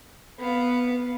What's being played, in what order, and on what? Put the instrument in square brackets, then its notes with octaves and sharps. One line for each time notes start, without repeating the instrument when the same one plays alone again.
[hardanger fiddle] B3 F5